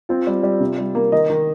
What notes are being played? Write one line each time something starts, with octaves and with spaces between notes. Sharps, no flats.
C4 F4
G3
G3
C3
G3
A#3
D#3 D#5
D#3